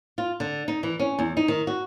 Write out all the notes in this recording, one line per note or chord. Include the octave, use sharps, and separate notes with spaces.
F4
D3
D#4
E3
C#4
E2
D#4
D#3
F#4